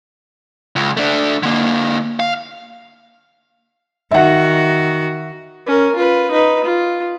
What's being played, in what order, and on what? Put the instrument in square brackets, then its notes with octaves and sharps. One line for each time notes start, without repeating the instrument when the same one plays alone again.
[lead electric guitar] C#2
A3 D4
D3 A#3
F5
[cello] D#3 F#4 [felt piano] E5 F#5
[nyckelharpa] C#4 A#4
F4 B4
D#4 B4
F4